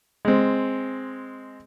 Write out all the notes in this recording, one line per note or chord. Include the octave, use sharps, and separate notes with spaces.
G#3 C4